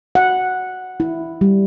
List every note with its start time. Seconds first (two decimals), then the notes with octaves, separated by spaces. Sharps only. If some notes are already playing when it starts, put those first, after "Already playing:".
0.15 F#5
1.00 E4
1.41 G3